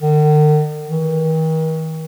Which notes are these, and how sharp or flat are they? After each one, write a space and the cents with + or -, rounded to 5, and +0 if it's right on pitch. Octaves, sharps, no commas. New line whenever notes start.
D#3 -45
D#3 +45